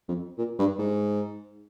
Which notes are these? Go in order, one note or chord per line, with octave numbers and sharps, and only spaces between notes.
F2
A#2
G2
G#2